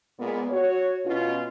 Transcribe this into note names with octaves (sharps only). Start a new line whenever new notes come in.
A#2 G#3 B3
F#4 C#5
B2 C#4 F4